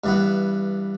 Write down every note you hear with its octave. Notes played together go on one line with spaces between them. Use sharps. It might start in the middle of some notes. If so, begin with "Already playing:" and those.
G2 E3 B3